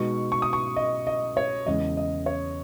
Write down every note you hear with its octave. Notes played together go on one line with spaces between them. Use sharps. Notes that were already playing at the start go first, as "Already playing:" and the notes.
Already playing: B2 G#3 D#4 C#6
C#6
D#6
C#6
D#5
D#5
C#5
E2 C#3 G#3 D#5
D#5
C#5